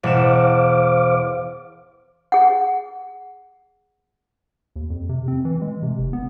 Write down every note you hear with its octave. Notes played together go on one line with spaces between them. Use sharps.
E1 C5 F5 F#5 D6 E7
G#4 F#5
D#2
F2
C3
C4
E3
G#3
C3
F1
B3